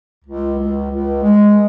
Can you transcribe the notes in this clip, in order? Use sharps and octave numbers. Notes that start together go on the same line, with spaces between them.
C#2
C#2
C#2
G#3